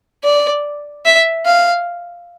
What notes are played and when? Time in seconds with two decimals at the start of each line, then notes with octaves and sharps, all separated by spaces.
0.24 D5
1.06 E5
1.46 F5